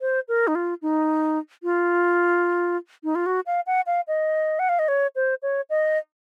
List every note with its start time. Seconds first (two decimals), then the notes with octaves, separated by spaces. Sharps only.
0.01 C5
0.28 A#4
0.47 D#4
0.55 F4
0.82 D#4
1.63 F4
3.04 D#4
3.15 F4
3.26 F#4
3.46 F5
3.67 F#5
3.87 F5
4.08 D#5
4.59 F#5
4.69 F5
4.79 D#5
4.88 C#5
5.16 C5
5.42 C#5
5.70 D#5